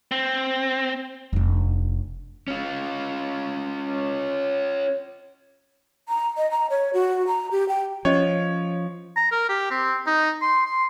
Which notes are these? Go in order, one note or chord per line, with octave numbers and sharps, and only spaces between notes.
C4
F1 D4
C#4 F4
A#5
D#5
A#5
C#5
F#4
A#5
G4
G5
F3 C#4 C5 C#5 D#5
A#5
A#4
G4
C4
D#4
C6
C6